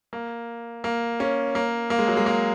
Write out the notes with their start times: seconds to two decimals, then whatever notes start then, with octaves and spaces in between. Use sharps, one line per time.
0.13 A#3
0.84 A#3
1.20 C#4
1.55 A#3
1.90 A#3
1.99 G#3
2.08 F#3
2.17 G#3
2.26 A#3